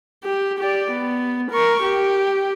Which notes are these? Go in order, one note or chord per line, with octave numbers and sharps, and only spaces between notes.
G4
G4 D5
B3
A#4 C#6
G4